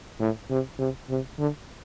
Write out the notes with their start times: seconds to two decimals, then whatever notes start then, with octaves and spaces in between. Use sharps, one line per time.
0.20 A2
0.50 C3
0.79 C3
1.10 C3
1.39 D3